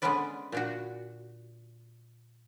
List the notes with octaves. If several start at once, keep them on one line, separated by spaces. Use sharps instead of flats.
D3 G#3 B3 C#4 B4 D5
A#2 D4 F#4